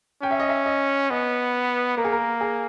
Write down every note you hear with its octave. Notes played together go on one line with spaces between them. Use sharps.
C#4 G5
E5
D#5
E5
D#5
B3 D#5
A#3 A#4
G#4
A#4
G#4